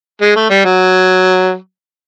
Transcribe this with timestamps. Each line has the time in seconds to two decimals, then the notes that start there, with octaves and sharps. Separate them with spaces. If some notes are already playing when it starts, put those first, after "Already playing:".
0.22 G#3
0.36 A3
0.50 G3
0.65 F#3